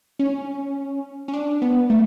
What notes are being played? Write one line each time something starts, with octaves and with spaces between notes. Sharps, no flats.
C#4
C#4
D4
B3
A3